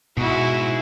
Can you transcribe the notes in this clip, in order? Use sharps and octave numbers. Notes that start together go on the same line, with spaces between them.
G#2 B2 E4 F#4